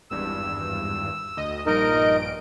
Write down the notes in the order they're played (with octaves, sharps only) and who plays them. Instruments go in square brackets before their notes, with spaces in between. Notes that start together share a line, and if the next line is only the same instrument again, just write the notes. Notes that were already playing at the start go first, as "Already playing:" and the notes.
[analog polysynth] G#1 E2 G2 [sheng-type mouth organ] E6
[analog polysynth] D2 D#5
[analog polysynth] A#1 G2 D7 [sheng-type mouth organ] D#4 A#4 D#5